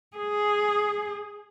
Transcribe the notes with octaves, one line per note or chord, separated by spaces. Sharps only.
G#4